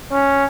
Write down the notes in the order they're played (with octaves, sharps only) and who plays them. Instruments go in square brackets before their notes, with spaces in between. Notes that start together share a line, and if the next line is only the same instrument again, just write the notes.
[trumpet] C#4